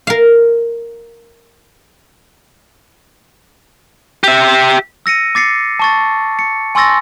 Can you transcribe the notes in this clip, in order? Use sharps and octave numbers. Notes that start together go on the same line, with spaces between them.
A#4 F5
G4 E5
E6 A#6 C#7 D#7
D6 A6 C7 C#7
A5 C#6 A6
C#7
G#5 C6 C#6 E6 A6 A#6